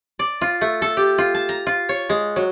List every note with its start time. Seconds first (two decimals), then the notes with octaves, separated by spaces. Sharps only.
0.19 D5
0.41 F4
0.61 A3
0.82 A4
0.97 G4
1.18 F4
1.34 A5
1.49 A#5
1.66 F4
1.89 C#5
2.09 G#3
2.36 F#3